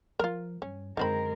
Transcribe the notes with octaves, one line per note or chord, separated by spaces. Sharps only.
F3 F4 A#4
G2 C#4
F#2 D3 D#3 G#3 C4 A#4 B5